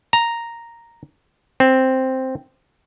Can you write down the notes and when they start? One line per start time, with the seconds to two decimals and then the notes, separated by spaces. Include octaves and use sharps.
0.13 A#5
1.60 C4